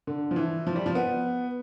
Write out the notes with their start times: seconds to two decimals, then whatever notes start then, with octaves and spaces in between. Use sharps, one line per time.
0.07 D3
0.31 F3
0.36 E3
0.67 F3
0.76 G3
0.86 F3
0.95 B3